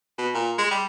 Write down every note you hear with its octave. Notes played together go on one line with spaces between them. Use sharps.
B2
A#2
G#3
G3